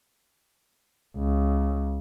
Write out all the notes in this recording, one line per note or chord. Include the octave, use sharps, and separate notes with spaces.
C#2